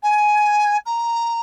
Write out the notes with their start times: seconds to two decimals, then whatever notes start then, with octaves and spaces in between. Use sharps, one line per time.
0.03 G#5
0.86 A#5